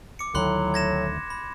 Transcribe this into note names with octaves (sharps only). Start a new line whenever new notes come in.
D6 C#7
D2 A2 D#3 F#3 B5 C6 F#6
G#6 A#6 E7
B5